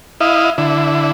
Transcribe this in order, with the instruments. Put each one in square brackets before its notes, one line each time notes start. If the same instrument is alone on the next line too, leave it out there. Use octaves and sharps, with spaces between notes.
[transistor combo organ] E4 D#5 F5
D3 E4